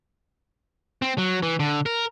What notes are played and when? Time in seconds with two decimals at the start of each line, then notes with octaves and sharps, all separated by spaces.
1.02 C4
1.18 F#3
1.43 E3
1.60 D3
1.86 A#4